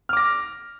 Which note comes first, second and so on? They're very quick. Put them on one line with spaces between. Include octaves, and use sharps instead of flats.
F6 D6 A#6